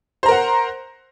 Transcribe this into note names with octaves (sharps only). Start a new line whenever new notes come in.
A#4 C5 F#5 A#5